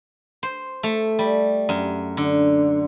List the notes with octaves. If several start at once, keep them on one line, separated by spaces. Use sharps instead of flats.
C5
A3
G3
F#2
D3